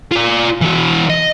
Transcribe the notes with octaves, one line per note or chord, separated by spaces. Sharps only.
F4 D5
E3 F#4
D#5